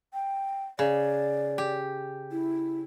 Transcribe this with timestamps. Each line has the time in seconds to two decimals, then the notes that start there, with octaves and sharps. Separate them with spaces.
0.14 G5
0.79 C#3 D5
1.58 G4
2.32 E4